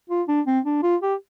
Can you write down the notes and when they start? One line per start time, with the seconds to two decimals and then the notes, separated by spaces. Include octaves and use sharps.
0.10 F4
0.28 D4
0.47 C4
0.65 D4
0.83 F4
1.02 G4